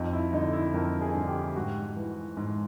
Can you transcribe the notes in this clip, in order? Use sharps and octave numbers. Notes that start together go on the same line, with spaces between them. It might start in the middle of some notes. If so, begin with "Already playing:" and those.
Already playing: F2 D#4
E4
D3 D#4
E4
F2 A#4
G#4
D3
G4
G#2 F#4
E3
G#2